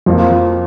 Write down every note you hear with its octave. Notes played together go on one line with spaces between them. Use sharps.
F2 F3 A#3